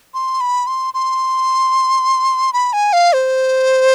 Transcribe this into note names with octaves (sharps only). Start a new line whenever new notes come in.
C6
B5
C6
C6
B5
G#5
F5
C5